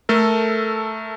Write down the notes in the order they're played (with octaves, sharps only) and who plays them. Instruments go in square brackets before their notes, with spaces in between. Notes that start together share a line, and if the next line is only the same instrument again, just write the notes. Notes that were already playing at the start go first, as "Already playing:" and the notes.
[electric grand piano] A3 A4 A#4